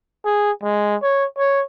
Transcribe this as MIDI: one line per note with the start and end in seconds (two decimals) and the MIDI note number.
0.25 0.51 68
0.63 0.95 56
1.02 1.26 73
1.38 1.63 73